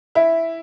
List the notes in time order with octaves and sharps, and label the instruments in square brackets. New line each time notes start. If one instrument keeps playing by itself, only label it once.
[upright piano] E4